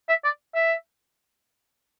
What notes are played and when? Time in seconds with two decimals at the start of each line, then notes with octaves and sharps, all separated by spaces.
0.09 E5
0.24 D5
0.55 E5